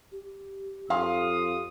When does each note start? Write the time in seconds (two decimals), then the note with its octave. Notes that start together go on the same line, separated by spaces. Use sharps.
0.12 G4
0.90 F2 F5 C6 D#6